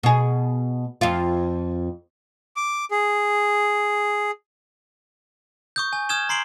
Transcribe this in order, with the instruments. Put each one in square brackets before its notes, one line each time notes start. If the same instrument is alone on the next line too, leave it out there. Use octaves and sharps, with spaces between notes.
[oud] B2 G#4
F2 F4
[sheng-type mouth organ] D6
G#4
[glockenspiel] C#6 D#6 G6
G#5
C#6 D#6 F6 G#6 E7 G7
A#5 C6 C7 D7 F#7 G7